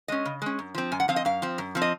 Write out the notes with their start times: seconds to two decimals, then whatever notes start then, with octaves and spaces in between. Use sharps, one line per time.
0.08 G#3 C#4 D#5
0.25 C#3
0.42 G#3 C#4
0.59 F#2
0.75 F3 C4
0.92 F#2 G#5
1.00 F#5
1.08 F3 C4 F5
1.16 D#5
1.25 F#2 F5
1.42 F3 C4
1.58 F#2
1.75 F3 C4
1.82 D#5